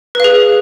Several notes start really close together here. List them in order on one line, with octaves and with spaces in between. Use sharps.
B4 F5 G#4